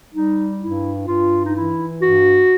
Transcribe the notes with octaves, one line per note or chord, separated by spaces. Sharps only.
G3 D#4
G2 E4
G2 F4
D#4
E3 E4
G2 F#4